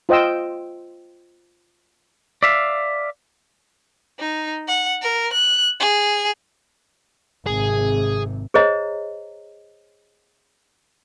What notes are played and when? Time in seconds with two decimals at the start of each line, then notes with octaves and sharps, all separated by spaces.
0.09 F4 C5 D#5 G5 E6
2.43 D5 E5 F5
4.19 D#4
4.68 F#5
5.01 A#4
5.33 F#6
5.80 G#4
7.46 G#1 C3 G#4
8.54 G#4 C5 C#5 D#5 A#5